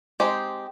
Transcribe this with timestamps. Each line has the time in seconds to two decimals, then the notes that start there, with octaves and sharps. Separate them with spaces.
0.20 G#3 C4 D#4 G4 C5